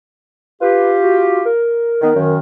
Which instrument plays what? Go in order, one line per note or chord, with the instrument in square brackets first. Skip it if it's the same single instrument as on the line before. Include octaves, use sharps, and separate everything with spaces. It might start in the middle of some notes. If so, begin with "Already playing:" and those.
[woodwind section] F4 G4 [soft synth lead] B4
[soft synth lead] F#4
A#4
[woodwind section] D#3 B3
F#2 D#3